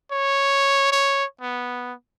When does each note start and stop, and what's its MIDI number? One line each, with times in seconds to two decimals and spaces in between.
0.11 0.88 73
0.92 1.25 73
1.41 1.93 59